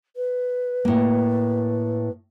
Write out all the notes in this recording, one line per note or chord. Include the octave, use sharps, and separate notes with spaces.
B4
A2 A#3